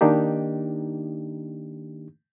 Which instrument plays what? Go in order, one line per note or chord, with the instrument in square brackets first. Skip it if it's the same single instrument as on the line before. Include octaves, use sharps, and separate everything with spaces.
[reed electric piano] D#3 A#3 D4 D#4 G4